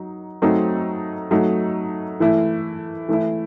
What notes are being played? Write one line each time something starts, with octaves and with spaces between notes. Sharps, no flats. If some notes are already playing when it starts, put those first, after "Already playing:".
Already playing: F#3 D#4
F#3 A3 C4 D#4
F#3 A3 D#4
E3 A3 E4
E3 A3 E4